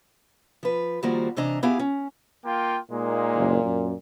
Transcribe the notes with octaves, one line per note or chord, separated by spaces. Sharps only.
F3 B4
D#3 F3 G3 A#3 F#4 C5
C3 E3 D4 D#5 A#5
B3 E4 G4 G#4 F5 G#5
C#4
A#3 F4 G5
A#2 G#3 A#3 D#4
F#1
F#2